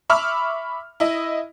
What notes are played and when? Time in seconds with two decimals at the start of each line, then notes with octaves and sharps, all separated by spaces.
0.10 E5 B5 C#6 D6 E6 F6
1.00 E4 D#5